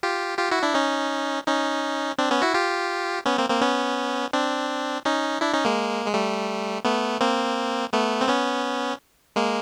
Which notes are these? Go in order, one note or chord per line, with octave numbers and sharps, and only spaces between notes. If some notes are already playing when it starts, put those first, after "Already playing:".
F4 G4
F4 G4
E4 F#4
D4 E4
C#4 D#4
C#4 D#4
C4 D4
B3 C#4
E4 F#4
F4 G4
B3 C#4
A#3 C4
A#3 C4
B3 C#4
C4 D4
C#4 D#4
D4 E4
C#4 D#4
G#3 A#3
G#3
G3 A3
A3 B3
A#3 C4
A3 B3
C4
B3 C#4
G#3 A#3